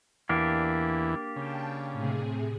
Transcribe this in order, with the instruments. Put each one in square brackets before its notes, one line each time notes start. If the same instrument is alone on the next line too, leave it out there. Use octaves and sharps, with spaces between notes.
[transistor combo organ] E2 E3 [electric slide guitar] A#3 D4 G4
[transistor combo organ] C#3 [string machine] G5 A5
[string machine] A2 C3 G#4